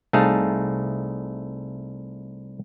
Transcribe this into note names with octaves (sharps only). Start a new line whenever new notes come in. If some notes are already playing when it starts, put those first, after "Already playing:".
C2 A3 D#4 G#4 F5 A5